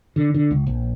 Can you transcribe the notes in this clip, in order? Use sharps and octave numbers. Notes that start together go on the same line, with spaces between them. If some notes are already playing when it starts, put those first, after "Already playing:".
D3
D3
C#2
A#1